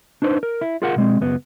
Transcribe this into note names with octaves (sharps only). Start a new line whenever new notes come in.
D4 D#4 B4 C5
A#4
E4
F4 G#4 A#4 F5 F#5
B2 G#3 C4
C#2 F#2 B3